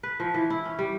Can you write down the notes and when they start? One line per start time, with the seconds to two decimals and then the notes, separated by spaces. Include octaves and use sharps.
0.03 B4
0.20 F3
0.34 E3
0.50 E4
0.65 C#4
0.79 G3